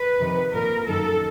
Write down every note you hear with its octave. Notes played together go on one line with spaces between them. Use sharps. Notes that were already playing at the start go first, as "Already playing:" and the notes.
Already playing: B4
F2 C3 D#3
A#2 F3 A#4
F#2 D#3 A4